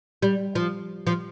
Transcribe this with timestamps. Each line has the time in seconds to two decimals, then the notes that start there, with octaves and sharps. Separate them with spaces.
0.22 G3
0.55 F3
1.07 F3